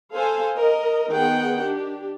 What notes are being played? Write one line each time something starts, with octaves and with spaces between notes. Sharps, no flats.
A4 C5 F5 G#5
A#4 D#5
D#3 B3 G#4 F#5 G5
D4 G4